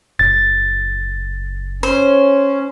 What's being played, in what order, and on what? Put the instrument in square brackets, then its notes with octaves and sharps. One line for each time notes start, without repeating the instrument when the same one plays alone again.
[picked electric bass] F#1 [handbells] A6
[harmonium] C#4 [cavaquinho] C5